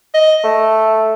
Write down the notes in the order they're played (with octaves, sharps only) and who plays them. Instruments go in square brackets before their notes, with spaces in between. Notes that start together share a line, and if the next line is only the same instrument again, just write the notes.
[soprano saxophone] D#5
[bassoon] A3